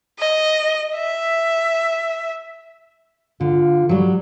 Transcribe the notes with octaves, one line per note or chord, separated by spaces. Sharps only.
D#5
E5
D3 F4
F#3 G3 F#4